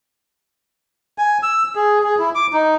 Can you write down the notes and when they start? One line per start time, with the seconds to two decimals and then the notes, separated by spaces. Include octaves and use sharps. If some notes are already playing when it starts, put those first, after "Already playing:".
1.18 G#5
1.43 E6
1.75 G#4
2.03 G#4
2.19 E4
2.35 D6
2.53 D#4